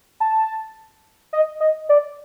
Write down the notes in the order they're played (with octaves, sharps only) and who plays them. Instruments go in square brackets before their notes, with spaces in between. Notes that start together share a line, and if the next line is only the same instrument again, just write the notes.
[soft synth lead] A5
D#5
D#5
D5